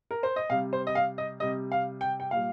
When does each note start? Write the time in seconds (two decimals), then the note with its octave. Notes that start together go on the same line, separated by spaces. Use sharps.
0.11 A#4
0.23 C5
0.36 D#5
0.50 C3 G3 F5
0.73 C5
0.87 D#5
0.95 F5
1.18 D#5
1.40 C3 G3 D#5
1.72 F5
2.01 G5
2.20 G5
2.31 A#2 G3 F5